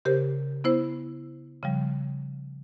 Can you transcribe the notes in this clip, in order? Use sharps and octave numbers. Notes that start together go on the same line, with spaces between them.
C#3 G4 A#4 C5
B3 E4 C5
C#3 F3 G3